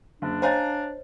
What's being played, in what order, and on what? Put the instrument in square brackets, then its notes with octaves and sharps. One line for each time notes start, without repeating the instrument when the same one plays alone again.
[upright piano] F#1 [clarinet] D4
[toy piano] C5 C#5 D#5 [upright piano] F5 G#5 A#5